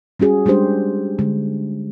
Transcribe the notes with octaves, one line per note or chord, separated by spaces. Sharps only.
G3 C#4 F#4 G#4
G3 G#3 D4 G4 C5
D3 G#3